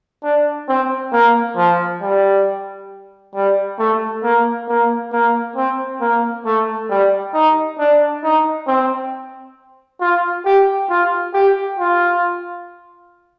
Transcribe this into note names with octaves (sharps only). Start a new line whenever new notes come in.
D4
C4
A#3
F3
G3
G3
A3
A#3
A#3
A#3
C4
A#3
A3
G3
D#4
D4
D#4
C4
F4
G4
F4
G4
F4